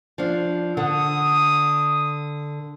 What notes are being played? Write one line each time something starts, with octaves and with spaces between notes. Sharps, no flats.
F3 D4
D3 A4 F#5 D#6